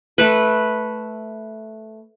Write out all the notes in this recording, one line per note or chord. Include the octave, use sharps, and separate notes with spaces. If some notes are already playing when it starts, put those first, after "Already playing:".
A3 B4